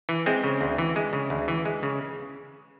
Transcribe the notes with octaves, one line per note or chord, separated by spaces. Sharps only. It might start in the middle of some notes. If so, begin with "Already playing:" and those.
E3
G#3 C4
C#3
D2
E3
G#3
C#3
D2
E3
G#3
C#3